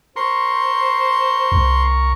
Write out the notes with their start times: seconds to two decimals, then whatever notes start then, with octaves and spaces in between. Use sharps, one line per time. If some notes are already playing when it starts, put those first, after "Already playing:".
0.16 A#4 C5 C6 C#6
1.52 C2